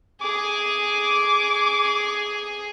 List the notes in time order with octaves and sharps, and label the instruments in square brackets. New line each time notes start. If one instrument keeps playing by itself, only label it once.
[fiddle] G#4 G#5 [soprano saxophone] D6